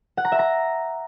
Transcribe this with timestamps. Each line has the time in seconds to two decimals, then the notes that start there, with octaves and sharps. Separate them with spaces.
0.17 F#5
0.25 A#5
0.32 E5
0.39 A#5